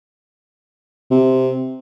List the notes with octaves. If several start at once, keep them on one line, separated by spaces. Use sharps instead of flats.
C3